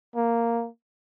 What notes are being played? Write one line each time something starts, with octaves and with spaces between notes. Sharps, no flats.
A#3